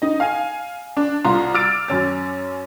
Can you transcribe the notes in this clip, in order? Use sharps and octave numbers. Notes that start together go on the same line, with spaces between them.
D#4 D#5
F5 G#5
D4
C2 F4 A#5 C6
D6 E6 F6 A6 D7
F#2 C#4 A6